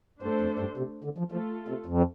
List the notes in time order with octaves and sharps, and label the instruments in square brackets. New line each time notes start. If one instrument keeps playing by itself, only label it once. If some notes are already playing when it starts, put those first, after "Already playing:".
[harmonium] G2 [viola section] A3 D4 A4 C5
[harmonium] F2
G2
C3
D3
F3
[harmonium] F3 [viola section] A3 F4 A4
[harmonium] C3
F2